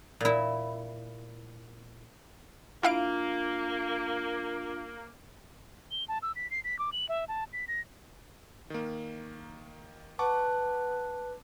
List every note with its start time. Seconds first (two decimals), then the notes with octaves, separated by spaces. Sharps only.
0.21 A#2 E4
2.83 A#3 D4 E4 F4 F5 D7
5.91 G7
6.09 A5
6.22 E6
6.36 B6
6.51 C7
6.64 B6
6.79 D6
6.92 F#7
7.09 E5
7.28 A5
7.53 B6
7.68 A#6
8.70 D#3 A#3
10.19 B4 F#5 A5 C#6 D6